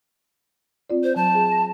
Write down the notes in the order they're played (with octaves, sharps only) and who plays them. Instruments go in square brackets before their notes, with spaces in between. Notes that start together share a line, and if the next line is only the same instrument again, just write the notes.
[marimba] C4 F4 D5
[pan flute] C5
[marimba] F#3 [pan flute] A5
[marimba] G#4
A#6